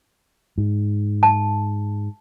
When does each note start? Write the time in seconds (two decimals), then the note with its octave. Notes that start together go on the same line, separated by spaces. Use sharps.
0.58 G#2
1.23 A5